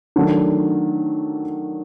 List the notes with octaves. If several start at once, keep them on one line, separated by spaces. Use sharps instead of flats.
D#3 F#3 A3 D4